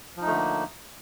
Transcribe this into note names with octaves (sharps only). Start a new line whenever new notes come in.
D3 F3 A3 A#3 D#4